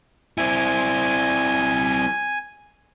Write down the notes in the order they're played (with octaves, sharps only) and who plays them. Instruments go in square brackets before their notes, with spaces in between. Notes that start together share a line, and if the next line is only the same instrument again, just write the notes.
[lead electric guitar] C4 E4 [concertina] G#5